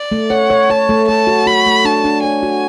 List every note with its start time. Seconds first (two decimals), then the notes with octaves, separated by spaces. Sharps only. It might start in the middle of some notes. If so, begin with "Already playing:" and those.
Already playing: D5
0.12 A3
0.30 C#5 F#5
0.50 C#5
0.70 C#5 A5
0.89 A3
1.08 A3 A5
1.27 F#4
1.46 F#4 B5
1.66 A3
1.85 D4 A5
2.04 D4
2.24 C#5 G#5
2.43 F#4